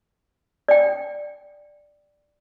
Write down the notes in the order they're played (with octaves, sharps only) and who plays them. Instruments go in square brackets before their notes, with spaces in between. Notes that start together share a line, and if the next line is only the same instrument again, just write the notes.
[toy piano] D5 G5